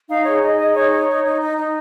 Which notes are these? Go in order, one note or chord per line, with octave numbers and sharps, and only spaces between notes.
D#4 F5
G#4 C#5
D#4 D#5
G#4 D#5
D#4 C#5
C#5
D#4
D#4
D#4
D#4